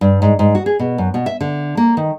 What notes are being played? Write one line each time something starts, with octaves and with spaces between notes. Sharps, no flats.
G2
G#2
G#2
F#4
G#4
B2
F#2
B2
E5
D3
A#3
D#3